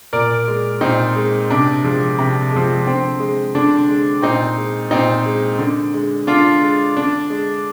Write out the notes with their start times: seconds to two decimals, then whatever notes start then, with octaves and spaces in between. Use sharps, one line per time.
0.13 A#2 A#4 D5
0.48 G#3
0.81 A#2 C4 D#4
1.16 G#3
1.50 C3 D4
1.84 F3 G#3
2.18 C3
2.52 F3 G#3
2.86 D3 C4
3.20 G#3
3.55 D3 D4
3.89 G#3
4.22 A#2 C4 D#4
4.58 G#3
4.91 A#2 C4 D#4
5.26 G#3
5.59 D3
5.94 G#3
6.27 D3 D4 F4
6.62 G#3
6.96 D3 D4
7.30 G#3